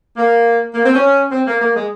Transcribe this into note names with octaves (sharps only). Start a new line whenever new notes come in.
A#3
A#3
C4
C#4
C4
A#3
A#3
G#3